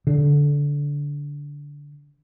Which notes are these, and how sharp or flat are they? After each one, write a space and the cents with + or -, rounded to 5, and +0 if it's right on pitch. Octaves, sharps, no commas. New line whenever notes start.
D3 -20